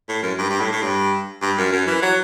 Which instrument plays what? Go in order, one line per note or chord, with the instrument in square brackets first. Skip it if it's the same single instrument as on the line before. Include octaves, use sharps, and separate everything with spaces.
[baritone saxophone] A2
F#2
G2
G2
A2
A2
G2
G2
F#2
F#2
E3
F#3